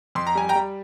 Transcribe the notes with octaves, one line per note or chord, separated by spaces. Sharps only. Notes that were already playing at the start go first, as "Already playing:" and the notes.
F2 C6
A#5
G3 G#5
G5 A#5
G3